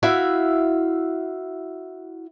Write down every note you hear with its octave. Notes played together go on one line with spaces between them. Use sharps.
E4 F#4 E5 F5